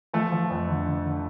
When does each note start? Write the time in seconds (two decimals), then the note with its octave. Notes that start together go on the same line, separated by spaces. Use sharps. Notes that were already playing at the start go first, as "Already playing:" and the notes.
0.13 F3 A3
0.32 F3
0.51 F2
0.69 D3
0.86 D3
1.05 D3